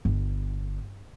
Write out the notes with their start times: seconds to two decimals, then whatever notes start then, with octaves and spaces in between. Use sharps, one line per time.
0.05 G1